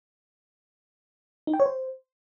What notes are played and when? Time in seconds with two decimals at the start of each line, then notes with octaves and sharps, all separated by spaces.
1.47 D#4
1.54 G5
1.60 C#5
1.66 C5